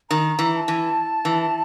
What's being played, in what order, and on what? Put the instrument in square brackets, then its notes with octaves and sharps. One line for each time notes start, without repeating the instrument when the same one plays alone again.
[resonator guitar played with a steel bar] D#3 [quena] A#5
[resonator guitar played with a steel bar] E3
[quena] A#5
A5
[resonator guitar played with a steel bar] E3
E3